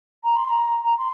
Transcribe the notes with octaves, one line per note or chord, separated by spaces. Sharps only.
A#5
C6
A#5
A#5
C6